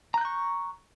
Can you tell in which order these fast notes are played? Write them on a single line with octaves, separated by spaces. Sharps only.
A#5 F#6 G6 C#6